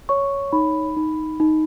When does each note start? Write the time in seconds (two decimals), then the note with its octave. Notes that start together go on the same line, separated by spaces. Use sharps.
0.09 C#5 C#6
0.53 D#4 B5
0.96 D#4
1.40 D#4